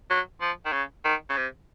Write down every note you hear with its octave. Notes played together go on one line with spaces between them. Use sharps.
F#3
F3
D#3
C#3
D#3
C#3
C3